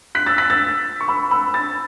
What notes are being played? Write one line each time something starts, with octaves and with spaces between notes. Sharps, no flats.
F#6 B6
E6 A6
F#6 B6
E6 A6
C#6
B5 E6
B5 E6
E6 A6